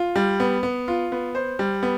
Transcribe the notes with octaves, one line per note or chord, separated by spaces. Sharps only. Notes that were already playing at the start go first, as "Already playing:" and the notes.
Already playing: F4
G3
B3
B3
F4
B3
C5
G3
B3